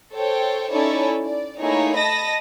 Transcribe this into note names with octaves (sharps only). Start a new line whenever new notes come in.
A4 C5 C#5 G5
C#4 D#4 E4 A4 C#5 D5
D5
A3 A#3 D#4 E4 G#4 C#5
D#5 A5 B5 D#6 A#6